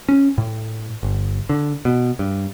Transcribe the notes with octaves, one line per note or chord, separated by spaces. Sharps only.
C#4
A2
G1
D3
B2
G2